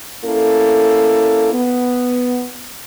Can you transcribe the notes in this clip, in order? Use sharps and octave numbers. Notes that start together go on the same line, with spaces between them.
A#3 C#4 E4 A4
B3